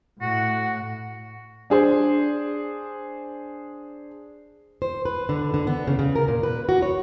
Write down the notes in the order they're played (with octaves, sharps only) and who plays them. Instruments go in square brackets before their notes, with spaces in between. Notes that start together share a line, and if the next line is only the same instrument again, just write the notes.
[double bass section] A2 [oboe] F#4 [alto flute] F#5
[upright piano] D4 G#4 C5
[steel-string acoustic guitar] C5
B4
D3
D3
B3
C#3
C#3
A#4
A#2
B4
F#4
C#5